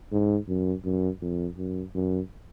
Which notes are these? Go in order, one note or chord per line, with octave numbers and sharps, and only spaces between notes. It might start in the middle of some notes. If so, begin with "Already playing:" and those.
G#2
F#2
F#2
F2
F#2
F#2